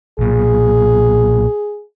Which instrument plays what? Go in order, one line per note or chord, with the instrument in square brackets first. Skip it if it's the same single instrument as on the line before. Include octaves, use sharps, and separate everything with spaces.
[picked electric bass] B1 A#2 [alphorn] G#4